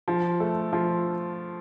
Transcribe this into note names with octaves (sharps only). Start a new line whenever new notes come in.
F3 F4
A3 A4
F3 F4